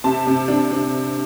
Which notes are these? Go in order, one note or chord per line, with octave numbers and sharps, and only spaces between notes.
C3 A5
C3
D4
D4